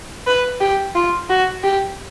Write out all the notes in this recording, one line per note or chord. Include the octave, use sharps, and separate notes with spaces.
B4
G4
F4
F#4
G4